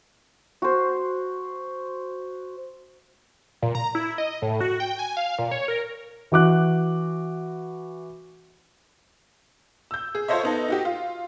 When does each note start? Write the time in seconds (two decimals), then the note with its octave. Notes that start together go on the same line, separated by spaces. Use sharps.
0.62 F#4 C5
3.62 A#2
3.75 A#5
3.95 E4
4.18 D#5
4.42 A2
4.61 F#4
4.80 G5
4.99 G#5
5.17 F5
5.39 A#2
5.51 C#5
5.68 A#4
6.32 E3 F#4 D6 F#6
9.91 E6 G6
10.15 G#4
10.28 F4 A4 C5 C#5 D#5 E5
10.43 B3 D#4 A4
10.68 D#4 F#4 G4
10.85 F4